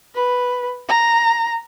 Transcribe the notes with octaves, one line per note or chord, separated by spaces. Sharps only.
B4
A#5